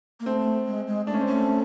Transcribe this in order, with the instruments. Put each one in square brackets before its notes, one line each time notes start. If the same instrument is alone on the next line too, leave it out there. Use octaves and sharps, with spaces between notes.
[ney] A#3
[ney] A3 [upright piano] C4
[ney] G#3
G#3
[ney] A3 [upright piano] D4
[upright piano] C#4
C4
[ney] A3 [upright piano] C#4
[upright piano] C#4